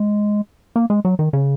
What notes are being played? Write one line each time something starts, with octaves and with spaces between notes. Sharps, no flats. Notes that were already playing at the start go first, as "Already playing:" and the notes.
Already playing: G#3
A#3
G#3
F#3
D#3
C#3